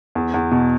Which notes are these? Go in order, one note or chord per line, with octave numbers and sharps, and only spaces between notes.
E2
E2
B2